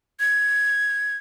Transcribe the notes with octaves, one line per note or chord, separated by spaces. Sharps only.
G#6